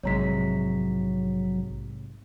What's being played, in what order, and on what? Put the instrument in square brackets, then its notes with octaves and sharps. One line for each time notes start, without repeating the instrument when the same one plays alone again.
[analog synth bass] A#1 [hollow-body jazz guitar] G#2 C3 G#3 [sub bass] F#3 [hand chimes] C#5 A#5 B6